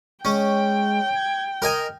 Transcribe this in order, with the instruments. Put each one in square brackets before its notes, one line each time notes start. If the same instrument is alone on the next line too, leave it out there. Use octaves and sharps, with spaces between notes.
[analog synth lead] G#3 [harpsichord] C#4 [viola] G5
[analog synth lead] G#6
[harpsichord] A#4 D#5 G#5 [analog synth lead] F6